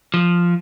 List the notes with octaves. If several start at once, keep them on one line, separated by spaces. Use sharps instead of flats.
F3